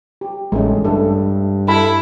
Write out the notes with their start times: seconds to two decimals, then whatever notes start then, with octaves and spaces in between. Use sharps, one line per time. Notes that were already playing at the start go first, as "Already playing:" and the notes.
0.21 G4
0.52 A1 G#3 A3 C#4
0.85 G2 A3 A4
1.68 E4 A4 A5 B5